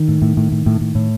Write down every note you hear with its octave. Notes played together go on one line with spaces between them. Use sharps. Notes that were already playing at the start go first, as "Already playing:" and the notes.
Already playing: D#3
A2
A2
A2
A2
A2
A2
A2